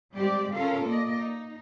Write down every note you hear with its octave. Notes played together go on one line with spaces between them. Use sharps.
G3 G#3 C4 G4 D5
C#4 F4 A4 A#4 F5
A#3 D5 D#5
D#4